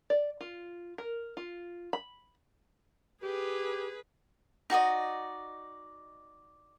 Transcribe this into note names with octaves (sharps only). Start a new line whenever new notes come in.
D5
F4
A#4
F4
B5
G4 G#4 B4
D#4 F#4 D5 D#5